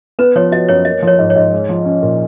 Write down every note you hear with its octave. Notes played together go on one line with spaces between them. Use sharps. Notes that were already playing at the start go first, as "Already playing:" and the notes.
B3 B4
F3 C#5
F#4 D#5
F#2 C#5
A#3 D#5
F3
C#5
G#2
C#5
G#2
G#3
F3
C#4
A#2